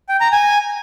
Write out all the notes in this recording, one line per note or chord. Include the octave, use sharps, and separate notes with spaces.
G5
A#5
G#5